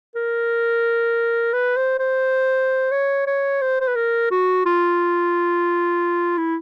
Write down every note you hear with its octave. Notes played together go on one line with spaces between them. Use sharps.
A#4
B4
C5
C5
C#5
C#5
C5
C5
B4
A#4
F#4
F4
E4